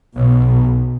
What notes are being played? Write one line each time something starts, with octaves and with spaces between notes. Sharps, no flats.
B1 B2